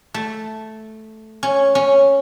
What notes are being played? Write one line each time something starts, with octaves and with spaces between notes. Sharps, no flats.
A3
C#4
C#4